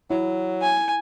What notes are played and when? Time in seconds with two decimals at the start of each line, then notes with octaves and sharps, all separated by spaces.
0.10 F#3 E4
0.62 G#5